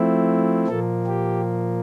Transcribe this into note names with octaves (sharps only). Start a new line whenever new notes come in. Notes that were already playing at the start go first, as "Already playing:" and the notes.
Already playing: F3 A3 C4 E4
A#2 F3 A#3 A4
G4